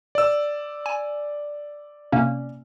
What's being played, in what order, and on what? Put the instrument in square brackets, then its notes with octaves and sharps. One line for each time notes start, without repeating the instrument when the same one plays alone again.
[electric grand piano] D5 E6
[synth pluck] G#5
C3 A#3 C#4